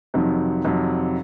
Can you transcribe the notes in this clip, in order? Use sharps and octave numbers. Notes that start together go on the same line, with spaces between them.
F2 C3 D#3 F#3
F2 C3 D#3 F#3